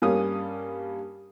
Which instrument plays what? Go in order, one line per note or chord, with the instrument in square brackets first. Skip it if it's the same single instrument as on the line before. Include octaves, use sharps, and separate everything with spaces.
[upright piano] G2 G3 A#3 C#4 D#6